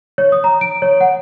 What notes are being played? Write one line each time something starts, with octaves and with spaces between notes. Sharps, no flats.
C#5
D#6
A#5
D7
C#5
F#5